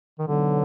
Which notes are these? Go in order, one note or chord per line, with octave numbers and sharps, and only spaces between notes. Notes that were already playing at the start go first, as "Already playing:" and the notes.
D#3
B1 B2 D3 F#3